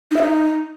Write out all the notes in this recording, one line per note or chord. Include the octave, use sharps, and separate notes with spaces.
D#4
E5
D#4